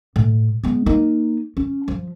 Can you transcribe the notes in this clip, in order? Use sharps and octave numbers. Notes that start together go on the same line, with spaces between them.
A2
G#3 B3
A#3 D#4
C#4
F3